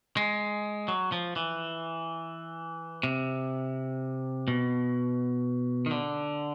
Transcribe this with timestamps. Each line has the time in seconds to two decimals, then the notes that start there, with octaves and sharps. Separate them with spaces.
0.17 G#3
0.88 F#3
1.12 F3
1.36 E3
3.03 C3
4.48 B2
5.86 D#3
5.91 D3